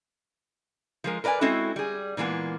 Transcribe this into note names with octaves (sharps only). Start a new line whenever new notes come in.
F3 G#3 A#4
A#4 B4 D5 D#5 G#5
G#3 C4 C#4 E4 F#4 A4
G3 G#4
A#2 E3 G#3 A#3 B3